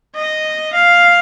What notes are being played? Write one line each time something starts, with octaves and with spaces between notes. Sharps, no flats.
D#5
F5